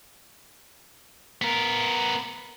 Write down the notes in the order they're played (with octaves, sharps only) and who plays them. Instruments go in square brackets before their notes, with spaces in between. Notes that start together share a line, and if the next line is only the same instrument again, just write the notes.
[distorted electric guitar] B3 A#4